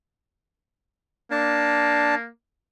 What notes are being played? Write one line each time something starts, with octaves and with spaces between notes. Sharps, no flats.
A#3 D4 A5